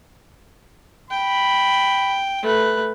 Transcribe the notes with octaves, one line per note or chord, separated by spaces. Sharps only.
G5 B5
A3 B4